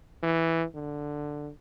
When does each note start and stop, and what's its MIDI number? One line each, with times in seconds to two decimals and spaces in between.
0.23 0.65 52
0.74 1.51 50